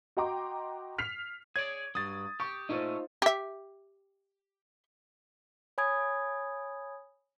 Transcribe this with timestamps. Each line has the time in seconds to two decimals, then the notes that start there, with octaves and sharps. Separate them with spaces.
0.17 F#4 D#5 G5 A#5 C6 D6
0.98 F6 B6 C7 F7
1.56 G#4 C#5 D5 G#6
1.95 G2 F#3 D#6 A6
2.40 G4 C#6
2.69 A#2 A3 C#4 D#4 F4 C5
3.22 G4 E5
5.78 C#5 G#5 B5 D#6 G#6